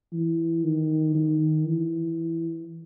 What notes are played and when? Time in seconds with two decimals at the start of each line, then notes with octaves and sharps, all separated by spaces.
0.12 E3
0.63 D#3
1.15 D#3
1.65 E3